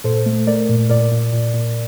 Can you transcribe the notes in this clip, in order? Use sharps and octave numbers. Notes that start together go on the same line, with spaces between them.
A#2 A4 C5
A3
A3 A#4 D5
A#2
A#2 A#4 D5
A#2
A#2
A#2